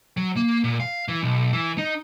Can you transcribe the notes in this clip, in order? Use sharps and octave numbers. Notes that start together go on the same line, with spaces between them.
F#3
A#3
A#2
F5
E3
B1
E3
D#4